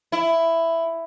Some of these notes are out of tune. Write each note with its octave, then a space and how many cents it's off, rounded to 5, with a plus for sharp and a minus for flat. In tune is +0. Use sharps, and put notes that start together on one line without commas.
E4 +5